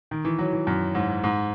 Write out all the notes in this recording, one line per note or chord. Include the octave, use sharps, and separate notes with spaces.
D#3
E3
F#3
E3
F#2
G#2
G#2